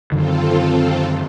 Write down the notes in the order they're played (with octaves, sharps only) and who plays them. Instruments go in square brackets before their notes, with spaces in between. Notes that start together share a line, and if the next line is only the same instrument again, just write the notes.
[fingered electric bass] F#2 D3 D#3 [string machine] C4 F4 A4